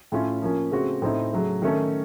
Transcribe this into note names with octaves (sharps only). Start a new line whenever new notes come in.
A2 A3 C#4 F4
F3 A#3 C#4
C#3 A3 C4 F#4
A2 A3 C4 D#4
C#3 F#3 A3
D#3 A3 C#4 A4